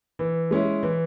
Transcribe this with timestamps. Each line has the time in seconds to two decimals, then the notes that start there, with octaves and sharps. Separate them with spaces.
0.19 E3
0.51 G#3 C#4 E4
0.83 E3